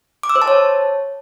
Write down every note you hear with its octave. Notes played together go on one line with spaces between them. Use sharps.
D6
E6
C5
A5
C#5